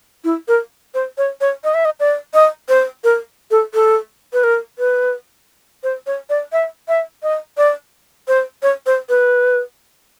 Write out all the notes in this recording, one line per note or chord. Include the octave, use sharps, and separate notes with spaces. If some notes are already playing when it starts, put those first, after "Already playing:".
E4
A#4
C5
C#5
C#5
D#5
E5
D#5
D5
D#5
C5
A#4
A4
A4
B4
A#4
B4
C5
C#5
D5
E5
E5
D#5
D5
C5
C#5
C5
B4